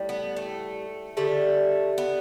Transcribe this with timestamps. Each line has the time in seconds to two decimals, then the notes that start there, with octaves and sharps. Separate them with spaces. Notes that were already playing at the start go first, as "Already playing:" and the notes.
Already playing: A2 G3
0.09 B3
0.36 A3
1.17 D3 G3 A3
1.98 B3